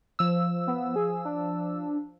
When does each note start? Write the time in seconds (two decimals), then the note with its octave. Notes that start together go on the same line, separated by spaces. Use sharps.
0.19 F3 E6
0.67 B3
0.96 G#4
1.25 D4